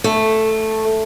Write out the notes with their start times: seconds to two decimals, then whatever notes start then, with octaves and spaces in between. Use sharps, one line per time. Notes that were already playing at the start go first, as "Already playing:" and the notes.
0.04 A3